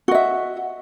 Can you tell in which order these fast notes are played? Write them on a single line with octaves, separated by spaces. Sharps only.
F#4 D#5 E5